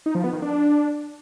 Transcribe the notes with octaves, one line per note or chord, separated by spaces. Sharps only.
D#4
F3
B3
D#3
D4